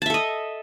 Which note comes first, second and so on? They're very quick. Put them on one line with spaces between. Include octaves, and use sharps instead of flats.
A5 E5 A4 D#5